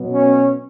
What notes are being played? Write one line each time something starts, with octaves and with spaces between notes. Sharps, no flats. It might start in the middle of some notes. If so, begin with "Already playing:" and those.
Already playing: B2 F#3 B3
C#4